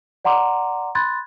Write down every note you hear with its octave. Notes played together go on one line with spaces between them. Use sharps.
D5 F#5 A#5 C6 D6
B5 C6 F#6 G#6 A6